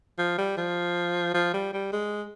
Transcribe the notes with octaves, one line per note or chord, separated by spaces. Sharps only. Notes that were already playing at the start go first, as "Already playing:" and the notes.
F3
G3
F3
F3
G3
G3
G#3